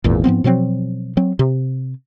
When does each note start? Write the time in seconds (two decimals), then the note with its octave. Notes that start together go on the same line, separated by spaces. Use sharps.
0.04 G#1 E2 A#2
0.24 G#2 F3 B3 C4
0.44 B2 F3 F#3 C4
1.17 F#3 C4
1.39 C3